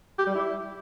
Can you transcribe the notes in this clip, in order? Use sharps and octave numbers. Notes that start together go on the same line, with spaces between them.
G4
G3
E4